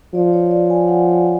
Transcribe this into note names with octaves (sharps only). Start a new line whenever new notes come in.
F3 D5
C#5
D5
G#5
F#5